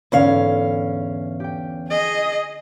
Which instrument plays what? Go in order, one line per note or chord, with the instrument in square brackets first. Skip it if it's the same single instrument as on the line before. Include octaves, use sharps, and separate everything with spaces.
[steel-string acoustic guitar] E2 C#4 F5 [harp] G#2 D3
[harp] G4 G5
[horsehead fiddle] G#4 D#5